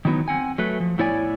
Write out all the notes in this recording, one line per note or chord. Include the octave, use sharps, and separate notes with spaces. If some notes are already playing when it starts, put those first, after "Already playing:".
D#3 E3 F#3 B3 D#4
C4 F#5 G#5
F#3 A3 B4
F3
A2 B3 E4 C#5 D5 G#5